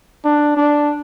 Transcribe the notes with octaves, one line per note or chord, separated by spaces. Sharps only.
D4
D4